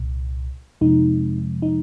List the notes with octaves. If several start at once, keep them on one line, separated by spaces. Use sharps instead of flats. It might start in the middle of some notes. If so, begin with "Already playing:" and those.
Already playing: C2 A#2
F2 C3 F3 G#3 D#4
D#4